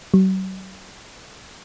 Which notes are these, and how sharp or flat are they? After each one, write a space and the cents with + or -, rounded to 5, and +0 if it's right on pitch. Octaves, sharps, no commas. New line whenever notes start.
F#3 +40